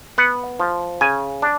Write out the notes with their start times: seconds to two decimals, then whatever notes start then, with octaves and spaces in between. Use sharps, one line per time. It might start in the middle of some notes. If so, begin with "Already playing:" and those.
0.18 B3 F#5
0.60 F3
1.01 C#3 G#5
1.42 D4